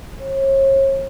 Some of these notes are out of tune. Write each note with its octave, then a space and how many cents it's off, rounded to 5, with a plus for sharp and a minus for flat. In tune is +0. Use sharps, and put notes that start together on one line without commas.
C#5 -40